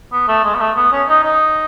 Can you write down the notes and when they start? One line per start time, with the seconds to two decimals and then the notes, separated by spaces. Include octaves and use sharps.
0.12 B3
0.28 A3
0.44 G#3
0.55 B3
0.60 A3
0.76 B3
0.92 C#4
1.08 D#4
1.24 D#4